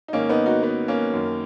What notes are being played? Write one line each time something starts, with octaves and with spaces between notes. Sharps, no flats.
D#4
G#2 D#3 A#3 C#4
B3 D#4
D#4 F#4
B3 D#4
A#3 C#4
F#2 D#3